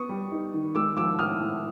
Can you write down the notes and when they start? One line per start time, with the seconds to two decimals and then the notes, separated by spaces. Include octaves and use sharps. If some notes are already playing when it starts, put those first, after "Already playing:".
Already playing: B3 C#6 D#6
0.09 G3
0.32 D#4
0.54 D#3
0.75 G#3 D6 E6
0.97 F3 D6 E6
1.19 A2 D#6 F6
1.40 A2